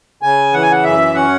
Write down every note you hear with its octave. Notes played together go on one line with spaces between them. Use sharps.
C#3 G#5
E3 F#5
G#5
F#5
F#2 E5
C#4 F#5